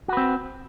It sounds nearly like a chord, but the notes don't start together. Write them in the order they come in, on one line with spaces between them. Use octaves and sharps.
F#4 B4 C4